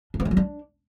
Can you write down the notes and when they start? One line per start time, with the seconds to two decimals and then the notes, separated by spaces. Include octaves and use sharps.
0.14 D4
0.20 B3
0.25 C#4
0.31 F#3
0.37 D4